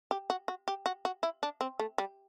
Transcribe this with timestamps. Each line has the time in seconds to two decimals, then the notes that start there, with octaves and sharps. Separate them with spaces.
0.11 G4
0.30 F#4
0.48 F#4
0.68 G4
0.86 F#4
1.05 F#4
1.23 E4
1.43 D4
1.61 C4
1.79 A3
1.98 G3